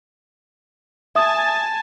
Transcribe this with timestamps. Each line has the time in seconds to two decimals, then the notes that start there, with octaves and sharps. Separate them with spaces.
1.15 E5 G#5 A5 D#6